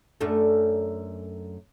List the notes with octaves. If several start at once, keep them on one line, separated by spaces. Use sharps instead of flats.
F#2 A3 D4